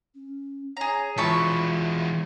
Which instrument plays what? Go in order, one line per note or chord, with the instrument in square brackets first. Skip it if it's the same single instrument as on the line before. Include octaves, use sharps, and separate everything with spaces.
[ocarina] C#4
[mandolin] G#4 A#5 [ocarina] C#5
[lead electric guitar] E3 G#3 [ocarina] F4 [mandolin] E5 [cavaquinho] A5 B5 C#6